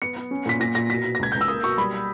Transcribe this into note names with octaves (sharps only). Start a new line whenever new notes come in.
B3 C#7
B3
C#4
A#2 B6
A#2 A#6
A#2 A#6
B2 B6
B2
A#6
C#2 G#6
C#2 G6
E6
A#3 D#6
B2 C#6
G3 B5